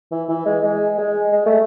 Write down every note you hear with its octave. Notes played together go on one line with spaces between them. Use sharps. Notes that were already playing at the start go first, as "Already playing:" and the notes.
E3
E3
G#3
G#3
G#3
G#3
A3